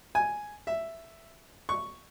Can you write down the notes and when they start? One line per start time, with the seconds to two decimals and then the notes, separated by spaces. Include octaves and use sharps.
0.15 G#5
0.67 E5
1.69 C#6